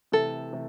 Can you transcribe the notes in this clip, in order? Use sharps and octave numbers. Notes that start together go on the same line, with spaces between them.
C3 E3 A3 A4
C3 E3 A3